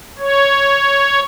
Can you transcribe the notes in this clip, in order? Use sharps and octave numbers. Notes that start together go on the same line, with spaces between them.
C#5